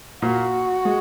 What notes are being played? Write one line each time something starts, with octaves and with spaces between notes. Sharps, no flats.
A#2 A#3 F#4
G#3